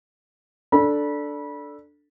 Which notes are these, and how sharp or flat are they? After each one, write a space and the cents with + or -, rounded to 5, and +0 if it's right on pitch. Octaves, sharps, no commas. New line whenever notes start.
D4 +0 A4 +0 B5 -25